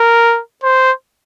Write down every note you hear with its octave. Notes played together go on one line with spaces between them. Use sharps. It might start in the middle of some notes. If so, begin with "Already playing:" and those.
Already playing: A#4
C5